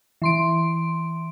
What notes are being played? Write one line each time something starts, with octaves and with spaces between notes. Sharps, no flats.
E3 C6 D7